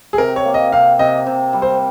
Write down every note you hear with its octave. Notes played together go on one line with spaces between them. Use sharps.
G#4
C3 A#4
C#5
A#3
D#5
C3 F5
C3 D#5
C3
G3
C5